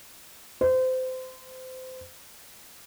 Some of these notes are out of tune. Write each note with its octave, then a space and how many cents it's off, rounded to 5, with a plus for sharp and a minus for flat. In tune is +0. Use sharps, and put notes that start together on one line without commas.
C5 -25